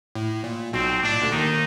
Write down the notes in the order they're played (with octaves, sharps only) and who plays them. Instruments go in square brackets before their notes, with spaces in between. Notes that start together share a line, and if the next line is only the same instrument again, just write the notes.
[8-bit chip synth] A2
A#2
[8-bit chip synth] B1 B2 [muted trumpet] C4
[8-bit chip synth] A2 [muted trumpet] D4
[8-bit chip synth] A#2
D2 D3
[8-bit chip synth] D#2 D#3 [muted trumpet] D#4